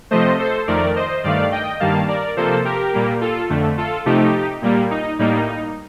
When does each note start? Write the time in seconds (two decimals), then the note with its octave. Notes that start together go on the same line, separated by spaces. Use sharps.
0.11 C3 F3 A3 C5 D#5
0.39 A4 C5
0.67 F2 D#3 A3 A#4 D5
0.95 C5 D#5
1.24 G2 D#3 A3 D5 F5
1.52 D#5 G5
1.80 G2 D#3 G3 A#3 F5 A5
2.08 A#4 D5
2.36 C3 F3 A#3 A4 C5
2.65 G4 A#4
2.93 A#2 G3 A#3
3.21 F4 A4
3.49 F2 D3 A3
3.78 F4 A4
4.06 C3 F3 A3 D#4 G4
4.62 A#2 G3 A#3
4.90 D#4
5.19 A2 G3 A#3 D#4